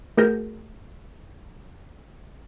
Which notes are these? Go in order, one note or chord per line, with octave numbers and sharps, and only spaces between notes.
A3 F#4 G#4 A#4 G6 A#6